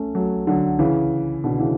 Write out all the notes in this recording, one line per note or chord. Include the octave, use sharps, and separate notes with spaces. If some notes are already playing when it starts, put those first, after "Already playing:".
Already playing: A3 C#4
F#3 A3
D3 F#3
C#3 E3
B2 D3
C#3 E3